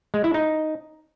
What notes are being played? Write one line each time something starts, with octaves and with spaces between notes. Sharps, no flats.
G#3
E4
D#4